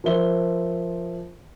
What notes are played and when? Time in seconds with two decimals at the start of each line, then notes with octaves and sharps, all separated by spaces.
0.04 F3 A#4 C5 E5 G7